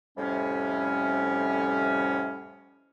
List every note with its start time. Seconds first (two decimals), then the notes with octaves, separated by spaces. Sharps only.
0.17 F2 A2 C3 G3 C#4